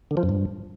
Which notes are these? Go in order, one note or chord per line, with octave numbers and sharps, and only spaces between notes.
D3
F3
F#2
G2